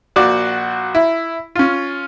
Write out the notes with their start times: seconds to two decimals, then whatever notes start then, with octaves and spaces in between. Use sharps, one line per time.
0.16 A#1 F#4 D5
0.95 E4
1.55 C#4 F4